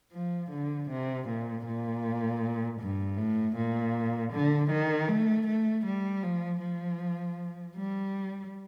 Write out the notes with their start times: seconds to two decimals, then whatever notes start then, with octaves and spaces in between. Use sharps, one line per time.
0.12 F3
0.51 D3
0.90 C3
1.28 A#2
1.66 A#2
2.80 G2
3.18 A2
3.56 A#2
4.33 D3
4.71 D#3
5.08 A3
5.47 A3
5.86 G3
6.23 F3
6.61 F3
7.76 G3